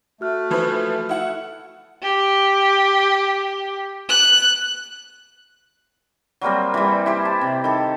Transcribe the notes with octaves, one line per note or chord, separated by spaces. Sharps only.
A3 F#4 F6 F#6
E3 F3 B4
E4 F#5
G4
F#6
F#3 G3 A#3 C4
E3 G3
E4 G4 C5 G#5
A5
C3
D#3 A4